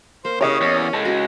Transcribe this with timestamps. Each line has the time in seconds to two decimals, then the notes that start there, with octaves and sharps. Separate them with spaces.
0.25 A#3 C5
0.41 C#3 E4 G4 C#5 D#5 C#6
0.61 E2 C#4
0.93 C#3 G#3 A4
1.05 F#4